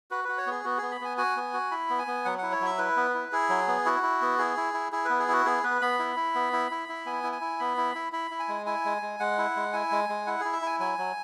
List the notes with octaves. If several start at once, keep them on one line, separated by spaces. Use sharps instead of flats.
F#4 B4
F#4 B4
C#5
B3 G#4
B3 F#4
B3 G#4
B5
B3 G#5
F#4 G#5
B3
F#4
E4 B5
B3
G#5
B3
F#3 F#5
E4 F#5
C#5
F#3 E5
E4 B4
B3
E4
E4 G#4
F#3
B3
E4 F#4
E4
B3
E4 G#4
E4
E4
E4 G#4
B3 B4
G#4
E4 F#4
B3 G#4
B3 B4
B3 B5
E4
E4
B3
E4
E4
E4
B3 G#5
E4
G#5
E4
B3 B5
E4
E4
E4 B5
E4
G#5
G#3
E4 G#5
G#3
G#3
G#3 F#5
E4
G#3
E4 G#5
G#3
G#3
E4 F#5
E4 G#4
E5
E4 G#5
F#3 G#5
F#3